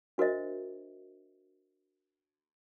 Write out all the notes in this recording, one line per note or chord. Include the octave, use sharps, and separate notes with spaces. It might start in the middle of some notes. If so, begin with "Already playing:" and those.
D4 F#4 A#4 C5 D#5 E5